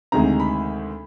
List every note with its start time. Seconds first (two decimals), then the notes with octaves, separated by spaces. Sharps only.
0.12 D2 C3 D#3 G#3 A#5
0.40 B5